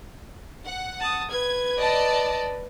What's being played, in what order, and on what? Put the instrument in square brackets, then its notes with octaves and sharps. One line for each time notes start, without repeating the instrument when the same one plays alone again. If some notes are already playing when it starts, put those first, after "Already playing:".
[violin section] F#5
[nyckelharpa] A5 D#6
[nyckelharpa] B4 [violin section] G#6
[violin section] D5 D#5 A5